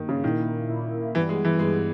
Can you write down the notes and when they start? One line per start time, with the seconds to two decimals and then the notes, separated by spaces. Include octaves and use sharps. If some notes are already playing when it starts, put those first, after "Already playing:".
Already playing: G2 D#3 A#3
0.09 C#3
0.24 A#2 D#3 A#3 E4
0.68 A#2 A#3 E4
1.14 G2 E3 G3 B3
1.29 G#3
1.45 E3
1.59 G2 G3 G#3 B3